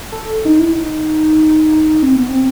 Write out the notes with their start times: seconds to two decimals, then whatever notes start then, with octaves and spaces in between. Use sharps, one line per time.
0.12 A4
0.45 D#4
0.59 E4
0.73 D#4
2.03 C4
2.16 B3
2.29 C4